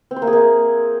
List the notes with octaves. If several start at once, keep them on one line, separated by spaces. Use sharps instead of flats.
C4
C5
A#3
G#4
A#3